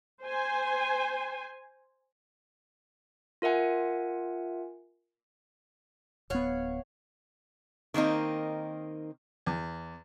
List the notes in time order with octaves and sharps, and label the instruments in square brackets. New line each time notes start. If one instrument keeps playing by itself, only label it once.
[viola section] C5 G#5
[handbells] F4 A#4 E5 F#5 G#5
[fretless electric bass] D1 B3 [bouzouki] C#5 F5 F#5
[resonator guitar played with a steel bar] D#3 A#3 C4 D#4
[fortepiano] E2